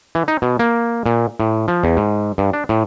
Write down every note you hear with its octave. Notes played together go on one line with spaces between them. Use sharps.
E3
D#4
B2
A#3
A#2
A2
F3
E2
G#2
G2
D4
A2